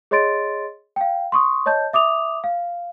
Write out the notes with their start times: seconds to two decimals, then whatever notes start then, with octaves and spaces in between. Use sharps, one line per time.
0.11 G#4 C#5 D#5 C6 A6 D7
0.96 F5 G5
1.32 C6 C#6 D#6
1.66 C#5 D#5 A5 G6
1.93 E5 D6 D#6 F7
2.44 F5